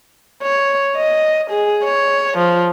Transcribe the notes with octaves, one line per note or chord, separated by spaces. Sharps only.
C#5
D#5
G#4
C#5
F3